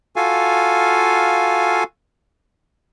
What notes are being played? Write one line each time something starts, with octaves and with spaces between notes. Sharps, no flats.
F4 F#4 A4 F5 G#5